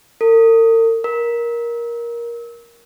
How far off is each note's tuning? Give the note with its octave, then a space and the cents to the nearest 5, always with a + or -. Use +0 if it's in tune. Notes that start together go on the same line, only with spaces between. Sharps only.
A#4 -45
A#4 +15